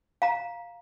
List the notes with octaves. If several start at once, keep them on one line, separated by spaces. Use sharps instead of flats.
F5 A#5